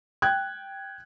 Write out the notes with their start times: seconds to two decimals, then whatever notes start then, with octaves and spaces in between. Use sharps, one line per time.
0.22 G5 F#6 G#6